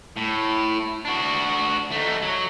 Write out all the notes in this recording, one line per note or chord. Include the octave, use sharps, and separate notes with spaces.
A2
D4 F#4
A3 D#4
F#3